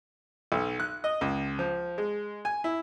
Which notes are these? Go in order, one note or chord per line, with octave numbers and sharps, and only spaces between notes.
B1
F#6
D#5
C#2
F3
G#3
G#5
E4